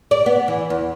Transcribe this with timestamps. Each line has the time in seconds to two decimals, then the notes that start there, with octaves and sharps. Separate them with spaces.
0.11 D5
0.26 B3
0.48 E3
0.70 E2